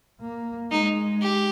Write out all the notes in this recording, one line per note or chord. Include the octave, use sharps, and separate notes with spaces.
A#3
G#3 D#4
G4